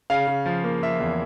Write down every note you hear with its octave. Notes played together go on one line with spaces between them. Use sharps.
C#3 F5
C#3
F3
A#3
F3 E5
E2